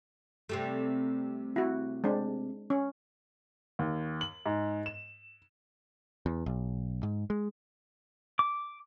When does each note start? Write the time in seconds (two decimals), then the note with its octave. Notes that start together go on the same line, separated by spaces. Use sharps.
0.49 C3 G3 A3
1.56 E4 F#4
2.04 G#3 C4 D4
2.70 C#4
3.79 D#2
4.21 F#7
4.46 G#2
4.86 E7
6.26 E2
6.46 B1
7.03 G#2
7.30 G#3
8.39 D6